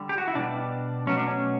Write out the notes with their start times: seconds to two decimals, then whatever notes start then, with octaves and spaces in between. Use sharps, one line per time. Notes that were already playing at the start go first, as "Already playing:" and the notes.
Already playing: D3 G3
0.09 G4
0.18 F#4
0.28 E4
0.35 B2 G3 D4
1.07 B2 F#3 A3 C#4
1.17 D4
1.27 C#4